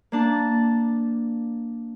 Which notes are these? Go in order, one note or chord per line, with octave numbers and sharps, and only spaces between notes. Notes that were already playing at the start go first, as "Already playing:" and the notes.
A#3 D4 A5